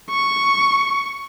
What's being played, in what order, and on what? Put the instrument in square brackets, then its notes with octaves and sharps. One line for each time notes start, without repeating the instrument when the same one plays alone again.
[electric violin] C#6